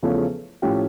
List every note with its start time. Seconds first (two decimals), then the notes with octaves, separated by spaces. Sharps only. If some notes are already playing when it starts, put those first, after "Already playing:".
0.02 E2 C#3 F3 A3 C#4
0.62 A2 F3 C#4 G4